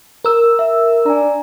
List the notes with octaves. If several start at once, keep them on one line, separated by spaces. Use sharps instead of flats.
A#4 E6
E5
D4 G#5 A#5